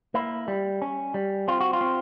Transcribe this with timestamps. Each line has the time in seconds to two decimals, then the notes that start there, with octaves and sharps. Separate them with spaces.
0.14 A#3 E4
0.48 G3
0.82 C#4
1.14 G3
1.48 C4 F4
1.60 F#4
1.73 F4
1.81 C4